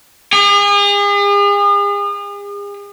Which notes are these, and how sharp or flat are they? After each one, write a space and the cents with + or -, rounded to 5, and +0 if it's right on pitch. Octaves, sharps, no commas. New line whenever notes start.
G#4 -40